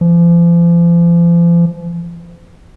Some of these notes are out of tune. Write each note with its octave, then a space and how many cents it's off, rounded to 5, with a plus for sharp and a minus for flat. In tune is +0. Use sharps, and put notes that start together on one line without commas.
F3 -40